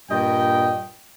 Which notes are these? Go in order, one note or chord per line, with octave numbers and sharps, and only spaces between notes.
G2 A#2 D#5 G5